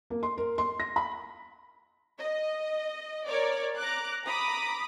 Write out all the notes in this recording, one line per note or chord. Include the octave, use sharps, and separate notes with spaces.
A#3
C6
A#4
C6
A#6
B5
D#5
A#4 C#5 D5 D6
A#5 D6 F#6
A#5 B5 D6 D#6